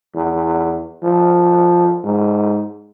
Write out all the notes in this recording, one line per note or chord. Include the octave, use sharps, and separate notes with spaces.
E2
F3
G#2